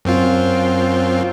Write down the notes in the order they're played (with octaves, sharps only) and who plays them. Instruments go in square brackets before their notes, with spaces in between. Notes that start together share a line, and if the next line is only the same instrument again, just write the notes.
[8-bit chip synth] F#2 C4 F4